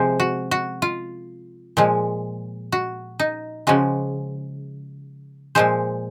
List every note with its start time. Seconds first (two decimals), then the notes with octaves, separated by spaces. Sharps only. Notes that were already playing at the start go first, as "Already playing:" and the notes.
Already playing: C3 F3 G#3 C5
0.20 F#4
0.51 F#4
0.82 F4
1.77 A#2 F3 G#3
2.72 F#4
3.19 D#4
3.67 C#3 F3 G#3 F#4
5.55 A#2 F3 G#3 C5